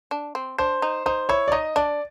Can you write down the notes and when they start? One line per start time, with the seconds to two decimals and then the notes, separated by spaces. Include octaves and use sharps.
0.11 D4
0.35 C4
0.58 D4 C5
0.82 D#4
1.06 D#4 C5
1.29 E4 C#5
1.48 D5
1.52 D#4 D#5
1.76 D4 D5